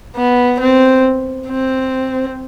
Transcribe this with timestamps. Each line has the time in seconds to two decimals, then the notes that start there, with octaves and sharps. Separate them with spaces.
0.16 B3
0.60 C4
1.47 C4